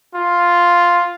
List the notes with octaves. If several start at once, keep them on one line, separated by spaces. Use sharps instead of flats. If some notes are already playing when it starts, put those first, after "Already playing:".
F4